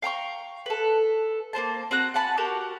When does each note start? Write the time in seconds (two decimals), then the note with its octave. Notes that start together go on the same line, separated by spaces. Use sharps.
0.02 F5 G5 A#5 C#6
0.66 A4 B4
1.53 A#3 C4 C5 A5
1.91 C4 F#4 A#5 F#6
2.14 F#5 G#5 A5 B5
2.37 F#4 G4 A#4